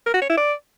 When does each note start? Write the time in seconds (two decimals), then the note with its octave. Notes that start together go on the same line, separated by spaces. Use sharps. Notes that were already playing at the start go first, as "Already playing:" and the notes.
0.06 A#4
0.14 F#4
0.22 C#5
0.30 E4
0.37 D5